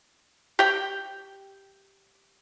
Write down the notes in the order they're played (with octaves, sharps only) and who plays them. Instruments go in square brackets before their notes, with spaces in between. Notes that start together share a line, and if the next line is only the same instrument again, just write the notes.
[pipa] G4 G5